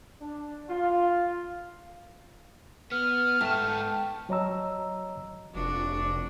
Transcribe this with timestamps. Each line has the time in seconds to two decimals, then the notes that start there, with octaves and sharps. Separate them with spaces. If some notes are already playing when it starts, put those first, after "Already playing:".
0.21 D4
0.70 F4
2.92 B3 F6
3.41 G#2 A3 G5 A5
4.29 F#3 C#5 D#5 A#5 E6
5.55 F1 D4 F#4